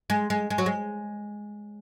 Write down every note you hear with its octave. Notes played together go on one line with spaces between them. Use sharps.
G#3
G#3
G#3
F#3
G#3